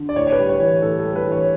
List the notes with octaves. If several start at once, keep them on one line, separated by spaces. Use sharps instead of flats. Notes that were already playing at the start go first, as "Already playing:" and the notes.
Already playing: D3
D5
A2 C#5
C#5
B4
G3
C#5
E3
B4
A2 A4
A4
G3
B4
E3 C#5